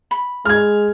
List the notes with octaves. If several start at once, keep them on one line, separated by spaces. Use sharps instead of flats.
B5
G#3 F6 G#6